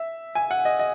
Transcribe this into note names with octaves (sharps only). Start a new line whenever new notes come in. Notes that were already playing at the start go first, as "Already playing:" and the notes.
Already playing: E5
G#5
F#5
D#5
D#5